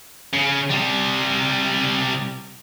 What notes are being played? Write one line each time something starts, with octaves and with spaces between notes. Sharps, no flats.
C#3
C3 G3